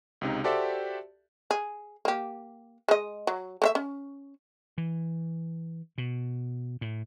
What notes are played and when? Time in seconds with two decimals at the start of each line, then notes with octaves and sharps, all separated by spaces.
0.21 C#2 C3 D#4
0.44 F#4 G4 A4 C5 D5 E5
1.51 G#4
2.05 A#3 G4
2.88 G#3 D#5
3.27 F#3
3.62 A3 A4 E5
3.75 C#4
4.78 E3
5.98 B2
6.81 A2